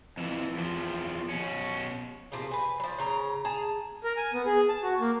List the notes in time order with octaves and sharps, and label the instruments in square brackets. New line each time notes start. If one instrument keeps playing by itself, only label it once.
[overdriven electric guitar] F2 E3
E2 F3
B2 C#4
[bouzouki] C3 F3 A#3 G#4
B4 G#5
F3 F#3
C#3 A#4 A#5
G#4 A5 A#5
[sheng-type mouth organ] A#4
G#5
B3
G#4
A5
F#4
A#3